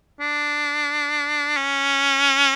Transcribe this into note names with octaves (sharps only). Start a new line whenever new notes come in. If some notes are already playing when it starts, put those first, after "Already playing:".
D4
C#4